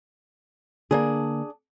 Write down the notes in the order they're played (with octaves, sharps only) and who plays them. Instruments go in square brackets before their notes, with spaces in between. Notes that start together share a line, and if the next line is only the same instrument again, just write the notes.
[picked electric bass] D3 A#3 [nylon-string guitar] D4 G#4